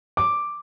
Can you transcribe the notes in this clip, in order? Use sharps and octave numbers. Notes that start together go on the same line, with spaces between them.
D6